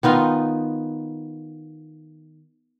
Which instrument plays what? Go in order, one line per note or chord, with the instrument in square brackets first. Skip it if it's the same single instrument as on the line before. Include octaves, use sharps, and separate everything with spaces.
[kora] D#3 B3 D#4 F4